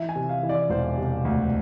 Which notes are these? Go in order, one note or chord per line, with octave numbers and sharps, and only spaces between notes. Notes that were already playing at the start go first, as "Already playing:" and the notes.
Already playing: E3 E5
G#5
C3
F5
E3
D5
E1 C5
C3
D2